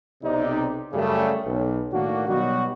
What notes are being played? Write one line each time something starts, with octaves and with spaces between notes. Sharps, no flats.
B1 C3 D#4 D5
F#2 C#3 G3 A3
B1
A2 D#3 A#3 D4 F#4
B2 F#3 G3 D#4 F#4